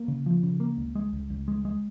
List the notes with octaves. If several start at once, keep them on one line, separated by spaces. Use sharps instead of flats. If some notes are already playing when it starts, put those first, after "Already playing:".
Already playing: A#3
C#3
F3
C#3
A#3
C#2
G#3
C#2
C#2
G#3
G#3